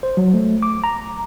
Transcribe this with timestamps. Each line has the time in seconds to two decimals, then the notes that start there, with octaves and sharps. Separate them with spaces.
0.03 C5
0.17 F#3
0.34 A3
0.63 D6
0.84 A#5